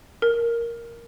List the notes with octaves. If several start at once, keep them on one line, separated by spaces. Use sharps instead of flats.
A#4